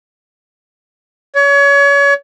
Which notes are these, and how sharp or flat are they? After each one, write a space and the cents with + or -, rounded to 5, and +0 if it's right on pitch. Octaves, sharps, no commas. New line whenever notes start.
C#5 +30